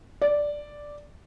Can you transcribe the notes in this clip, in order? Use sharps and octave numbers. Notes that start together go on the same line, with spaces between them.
D5